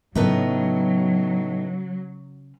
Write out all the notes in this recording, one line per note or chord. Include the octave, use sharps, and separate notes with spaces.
A2 C#3 F#3 B3 D#4